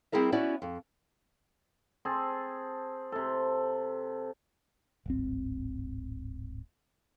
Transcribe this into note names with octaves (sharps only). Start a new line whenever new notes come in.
G3 C4 E4 G#4 A#4 E5
B3 C#4 E4 F#4 D5
F2
C4 G#4 A5
C3 A4
D1 G#1 C4